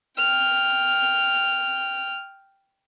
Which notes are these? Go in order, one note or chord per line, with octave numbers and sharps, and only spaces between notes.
G5 F6